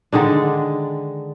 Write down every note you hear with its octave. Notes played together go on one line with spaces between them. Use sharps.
D3 D#3 G#3 D4